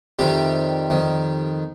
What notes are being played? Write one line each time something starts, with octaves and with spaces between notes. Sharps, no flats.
F2 C3 D#3 G3 G4
F2 D#3